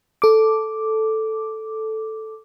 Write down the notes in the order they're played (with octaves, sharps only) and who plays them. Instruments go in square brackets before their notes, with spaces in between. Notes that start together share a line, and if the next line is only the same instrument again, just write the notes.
[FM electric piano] A4 D6